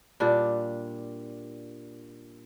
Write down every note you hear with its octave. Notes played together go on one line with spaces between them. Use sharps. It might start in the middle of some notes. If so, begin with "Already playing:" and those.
A#2 G3 D4